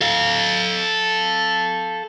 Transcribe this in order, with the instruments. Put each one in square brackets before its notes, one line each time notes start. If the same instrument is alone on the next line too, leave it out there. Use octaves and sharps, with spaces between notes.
[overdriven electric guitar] A4 F5